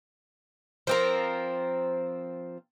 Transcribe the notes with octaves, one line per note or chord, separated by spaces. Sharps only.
F3 C4 A#4